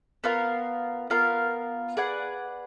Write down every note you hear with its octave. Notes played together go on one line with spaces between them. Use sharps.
B3 F4 A#4 F5
B3 F4 A#4 F5
G#4 B4 D5 F#5